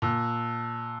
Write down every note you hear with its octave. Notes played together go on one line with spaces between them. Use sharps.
A#2 A5 E6 F#6